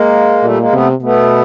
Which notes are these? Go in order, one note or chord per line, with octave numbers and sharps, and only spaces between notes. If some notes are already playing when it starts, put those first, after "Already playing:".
Already playing: G#3 A#3
A#2 G3 A3
G#3 A#3
C3 A3 B3
B2 A3 B3